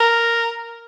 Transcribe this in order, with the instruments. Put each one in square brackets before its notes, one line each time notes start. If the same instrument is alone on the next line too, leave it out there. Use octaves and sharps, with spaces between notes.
[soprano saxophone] A#4